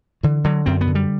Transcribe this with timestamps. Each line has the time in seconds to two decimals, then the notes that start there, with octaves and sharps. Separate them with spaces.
0.23 D3 E3
0.44 D3 F#3
0.66 F#2 C4
0.81 B3
0.87 D3
0.95 G3